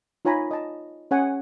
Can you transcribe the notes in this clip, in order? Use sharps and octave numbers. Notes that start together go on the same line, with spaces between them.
D#4 F4 C#5 G#5 A#5 B5
D#5 A5
C#4 G#4 C#5 F#5 G#5